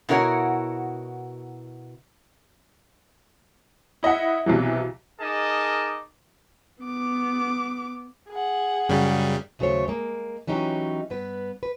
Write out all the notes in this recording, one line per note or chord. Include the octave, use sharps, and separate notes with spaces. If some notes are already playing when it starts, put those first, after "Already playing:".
B2 E4 F#4 A#4 C#5 F#5
E4 D#5 E5 F#5
B1 C3 E3 F#3
D#4 G#4 A#4 D#5 A5 D6
B3 D6
G#4 F#5
F#2 C#3 G3
D#2 C#3 F#3 A3 C5 C#5
G#3 A#3
E3 F#3 C#4 D#4 G4
G2 B3 B4
B4